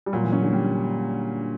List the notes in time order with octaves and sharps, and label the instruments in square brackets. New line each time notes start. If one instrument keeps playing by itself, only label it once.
[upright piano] G3
[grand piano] A#2 [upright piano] F#3
[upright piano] E3
[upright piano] F#3 [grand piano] C#4
[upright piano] D3
[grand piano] G3